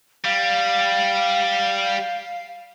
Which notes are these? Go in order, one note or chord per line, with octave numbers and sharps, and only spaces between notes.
G3 F5